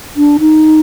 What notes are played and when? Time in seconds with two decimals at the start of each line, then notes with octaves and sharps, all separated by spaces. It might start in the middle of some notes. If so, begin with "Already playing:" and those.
0.16 D4
0.40 D#4